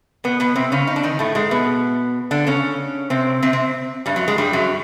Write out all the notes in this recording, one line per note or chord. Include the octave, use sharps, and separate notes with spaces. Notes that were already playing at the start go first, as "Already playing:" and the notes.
B2 B3
B2 B3
C3 C4
C#3 C#4
D#4
D4
D#3 D#4
A2 A3
G#2 G#3
B2 B3
D3 D4
C#3 C#4
C3 C4
C3 C4
C3 C4
G2 G3
F#2 F#3
G#2 G#3
G2 G3
F#2 F#3